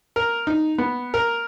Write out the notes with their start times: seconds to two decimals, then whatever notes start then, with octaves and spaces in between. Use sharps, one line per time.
0.16 A#4
0.47 D#4
0.78 B3
1.14 A#4